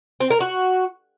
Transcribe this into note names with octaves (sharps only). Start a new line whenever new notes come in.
C4
A#4
F#4